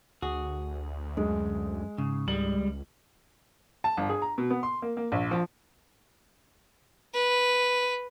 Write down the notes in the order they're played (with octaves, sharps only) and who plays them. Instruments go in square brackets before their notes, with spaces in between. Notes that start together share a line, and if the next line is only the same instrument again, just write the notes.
[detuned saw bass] D2 [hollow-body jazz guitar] F#4 [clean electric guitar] G#4
[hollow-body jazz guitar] F#2 [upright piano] G#3
[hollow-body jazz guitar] G#2 [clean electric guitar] C#3
[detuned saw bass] C#2 [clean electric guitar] G3 G#3 [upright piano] F#7
[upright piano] A5
G1
G#4
A#5
B2
B3
C6
A#3
A#3
A#1
F3
[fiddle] B4